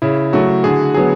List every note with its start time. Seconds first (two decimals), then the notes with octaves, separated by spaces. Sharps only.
0.02 C#3 E4
0.33 F#3 A3 F#4
0.64 D3 G#4
0.94 F#3 B3 G#4